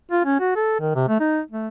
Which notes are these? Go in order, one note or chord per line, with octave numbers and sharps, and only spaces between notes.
F4
C#4
F#4
A4
D#3
C3
A3
D#4
A3